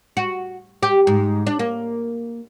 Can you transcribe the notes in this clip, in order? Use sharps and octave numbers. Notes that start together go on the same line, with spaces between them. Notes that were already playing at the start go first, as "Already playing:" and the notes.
F#4
G4
G#2
D4
A#3